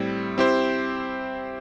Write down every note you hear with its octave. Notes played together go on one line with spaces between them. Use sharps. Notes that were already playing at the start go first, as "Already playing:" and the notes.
Already playing: A2 G3 C4 E4
C4 E4 G4 C5